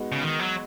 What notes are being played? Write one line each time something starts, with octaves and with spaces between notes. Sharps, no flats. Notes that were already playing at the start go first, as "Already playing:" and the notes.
Already playing: G#3 B3 D#4 F#4
C#3
D#3
F#3